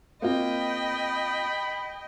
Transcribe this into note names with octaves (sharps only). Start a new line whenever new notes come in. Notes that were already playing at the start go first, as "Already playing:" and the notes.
A#3 C4 F4 D#5 G5 B5